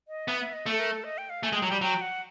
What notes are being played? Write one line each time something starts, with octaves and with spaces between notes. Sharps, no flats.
D#5
B3 E5
E5
D#5
A3
A4
A#4
A4
D#5
G5
F5
A3 G#5
G#3
G5
F#3
G3 G5
F#3 G5
F#5